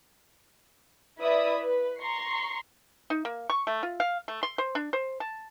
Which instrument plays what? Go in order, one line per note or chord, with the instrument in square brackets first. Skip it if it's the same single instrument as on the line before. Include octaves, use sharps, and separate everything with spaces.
[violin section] E4 B4 D5 E5 B5 D#6
B4
A#5 C6 C#6 C7
[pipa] D#4
A#3
C#6
A3
F4
F5
A3
C6
C5
D4
C5
A5